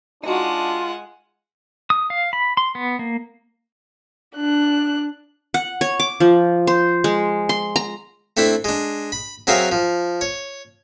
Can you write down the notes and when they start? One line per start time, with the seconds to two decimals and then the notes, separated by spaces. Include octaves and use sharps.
0.23 G#3 D4 D#4 F4 F#4 F#5
1.90 D#6
2.10 F5
2.33 B5
2.57 C6
2.75 B3
2.99 A#3
4.36 D4 F#6
5.54 F#5
5.81 C#5
6.00 D6
6.20 F3
6.67 C5
7.04 G#3
7.49 C6
7.76 A#5
8.37 A3 C4 D4 E4
8.64 G#3 D4
9.12 B5
9.47 F#3 C4 G#4 A#4 E5 F5
9.72 F3
10.21 C#5